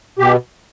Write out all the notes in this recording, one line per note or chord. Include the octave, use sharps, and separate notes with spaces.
B2 G4